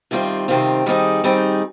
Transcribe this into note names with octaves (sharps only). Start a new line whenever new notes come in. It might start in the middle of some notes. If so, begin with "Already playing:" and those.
C3 D#3 G3 C4 F4
C3 D#3 G3 C4 F4
D#3 G3 C4 D#4 G#4
D#3 G3 C4 D#4 G#4